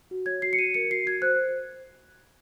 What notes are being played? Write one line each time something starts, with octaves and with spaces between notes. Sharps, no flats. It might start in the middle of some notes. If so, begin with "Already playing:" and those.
F#4
C#5 G#6
F#4 C7
C#7
F#4 D#7
A#4 C#7
F#4 C7
F#4 G#6
C5 F#6